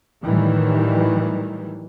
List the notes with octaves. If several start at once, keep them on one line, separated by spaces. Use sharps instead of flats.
A2 D#3 E3 F#3 G3